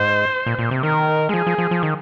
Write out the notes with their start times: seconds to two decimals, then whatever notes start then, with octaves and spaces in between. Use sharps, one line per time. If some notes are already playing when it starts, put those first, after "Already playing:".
Already playing: G#2 C5
0.46 A#2
0.59 A#2
0.71 C3
0.83 D#3 A#4
1.29 G#3
1.33 F3 G#4
1.47 F3
1.58 F3
1.71 F3
1.83 D#3